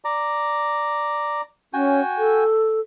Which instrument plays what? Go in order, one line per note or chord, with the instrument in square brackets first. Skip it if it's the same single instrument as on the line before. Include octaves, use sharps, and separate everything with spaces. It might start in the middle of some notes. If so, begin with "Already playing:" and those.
[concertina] D5 A#5
[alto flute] C#4 [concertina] F#4 G5 G#5
[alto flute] A4